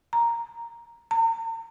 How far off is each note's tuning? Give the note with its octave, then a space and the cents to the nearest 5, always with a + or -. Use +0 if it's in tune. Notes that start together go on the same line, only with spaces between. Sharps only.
A#5 +0
A#5 -40